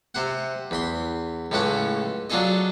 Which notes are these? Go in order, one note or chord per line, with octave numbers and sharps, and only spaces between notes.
C3 C5 F#5
E2 B5 C6
C#2 A2 A3 C#4 F#5 D6
F#3 D4 F4 G#4 A4 D#5